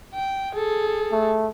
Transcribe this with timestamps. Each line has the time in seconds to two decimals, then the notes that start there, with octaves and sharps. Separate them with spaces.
0.14 G5
0.53 G#4 A4
1.12 A3